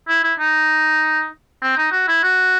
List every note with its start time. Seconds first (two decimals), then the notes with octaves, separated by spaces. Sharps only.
0.08 E4
0.23 E4
0.39 D#4
1.62 C4
1.77 D#4
1.92 F#4
2.08 E4
2.23 F#4